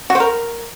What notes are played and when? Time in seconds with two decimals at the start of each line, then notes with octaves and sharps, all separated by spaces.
0.10 F#4
0.15 C5
0.20 A#4